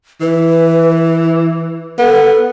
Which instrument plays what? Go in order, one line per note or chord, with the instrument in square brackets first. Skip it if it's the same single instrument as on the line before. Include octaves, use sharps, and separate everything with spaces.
[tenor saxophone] E3 [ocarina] B4
[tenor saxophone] B3 [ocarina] A4